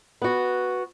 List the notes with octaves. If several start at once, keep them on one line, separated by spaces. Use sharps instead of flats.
B3 F#4